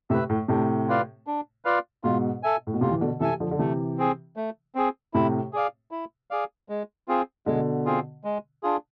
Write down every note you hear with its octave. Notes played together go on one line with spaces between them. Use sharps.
A2 C3 B4 E5
A2
A2 C3 D4
F4 B4 D5 F5
D4
F4 B4 D5 F5
G#2 B2 F4
A4 E5 G#5
A2
B2
A2 C3 F4
E3
B2 D3
C3 E3 A4 E5 G#5
D3 F3
D3
C3 E3 A3
C4 G#4
A3
C4 G#4
A2 C3 E4
G#4 D5 F5
E4
G#4 D5 F5
G#3
C4 F4 G#4
B2 D3 G#3
C4 F4 G#4
G#3
D4 F4 G#4